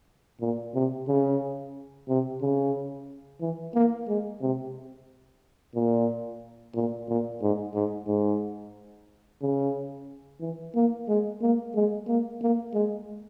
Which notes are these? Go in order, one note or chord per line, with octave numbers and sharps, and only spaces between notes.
A#2
C3
C#3
C3
C#3
E3
A#3
G#3
C3
A#2
A#2
A#2
G#2
G#2
G#2
C#3
E3
A#3
G#3
A#3
G#3
A#3
A#3
G#3